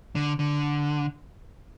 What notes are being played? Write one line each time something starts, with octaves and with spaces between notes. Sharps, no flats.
D3
D3